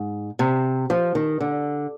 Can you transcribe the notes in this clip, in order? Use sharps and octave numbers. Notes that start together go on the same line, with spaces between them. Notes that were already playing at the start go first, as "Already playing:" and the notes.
Already playing: G#2
C3
F3
D#3
D3